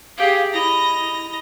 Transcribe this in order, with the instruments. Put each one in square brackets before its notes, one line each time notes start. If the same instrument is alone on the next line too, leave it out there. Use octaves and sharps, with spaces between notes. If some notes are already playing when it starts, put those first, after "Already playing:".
[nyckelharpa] G4 G#4 [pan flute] F5
[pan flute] E4 [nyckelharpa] D#5 A#5